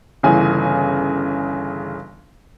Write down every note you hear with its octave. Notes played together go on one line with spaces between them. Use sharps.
G1 C#3 E3 G#5